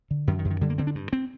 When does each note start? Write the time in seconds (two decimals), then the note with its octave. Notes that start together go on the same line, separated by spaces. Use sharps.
0.11 D3
0.27 F#2 D#3
0.39 D#3
0.45 F#2
0.50 D#3
0.61 D3 G3
0.70 A#3
0.78 D3 C4
0.87 D4
0.95 G2
1.13 C4